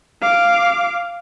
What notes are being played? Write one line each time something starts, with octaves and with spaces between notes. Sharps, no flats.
F5 D6